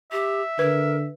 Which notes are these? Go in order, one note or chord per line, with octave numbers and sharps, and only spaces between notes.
G4 E5
D3 A#4 B4